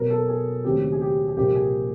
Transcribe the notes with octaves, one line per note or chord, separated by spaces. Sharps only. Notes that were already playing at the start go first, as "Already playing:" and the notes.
Already playing: B2 F#3 B3 A#4
A4
G#4
D#2 C#3 F#3 A3 C4 G4
G#4
G4
G#4
C2 A#2 F3 A#3 G4
G#4